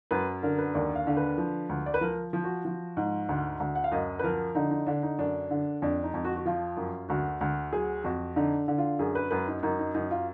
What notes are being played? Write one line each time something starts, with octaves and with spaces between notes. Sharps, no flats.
F#2 B4
D3 A#4
B4
D#2 D5
F5
D3
B4
F3
D2
D5
B4
F3 A#4
F3
F#4
F3
G#2
D2
D2
F#5
F5
F#2 D#5
B4
F3 A#4
D3 D#4
D#4
D3 D4
D#4
F#2 D4
D3
F2 D4
D#4
F2
F#4
F#4
F3 F4
F#2
D2 F#4
D2
F#3 G#4
F2 F#4
D3 D#4
D3
F4
F#2 G#4
B4
F#2 B4
D#4
F#2 D#4
D#4
F#2 D#4
F4